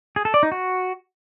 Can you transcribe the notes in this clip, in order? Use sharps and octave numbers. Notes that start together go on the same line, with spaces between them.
G#4
A4
D5
D#4
F#4